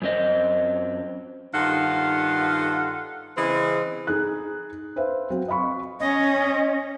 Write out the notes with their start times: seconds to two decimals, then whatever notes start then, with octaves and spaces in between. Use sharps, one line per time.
0.02 F#2 C4 D#5
1.54 G2 D#3 F4 A4 F5 F#5
3.37 C#3 E3 G#3 C4 G#4 D#5
4.07 D#4 G#4 F#6
4.96 B4 C5 E5 F5
5.30 F#3 C4
5.48 D#5 F5 B5 C#6
6.00 C#4 D#5